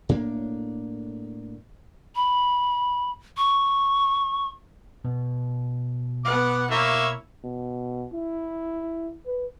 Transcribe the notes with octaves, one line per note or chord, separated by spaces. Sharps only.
A2 A#3 D4
B5
C#6
B2
B3 F#5 D6
A#3 E4 C#5 E5
B2
E4
B4